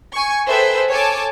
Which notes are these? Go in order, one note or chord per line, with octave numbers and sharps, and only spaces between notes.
G#5 C#6
G#4 A4 B4 C5 E5 G5
A4 C#5 G#5 A5 D6